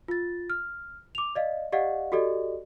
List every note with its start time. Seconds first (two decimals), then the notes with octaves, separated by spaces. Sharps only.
0.08 F4 A6
0.50 F6
1.15 D6 F7
1.35 D5 D#5 F5
1.72 G4 D5 D#5 F5 F#5
2.12 F#4 G4 A4 D5 D#5